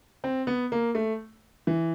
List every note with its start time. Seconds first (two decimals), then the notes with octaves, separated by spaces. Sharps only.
0.24 C4
0.47 B3
0.72 A#3
0.95 A3
1.67 E3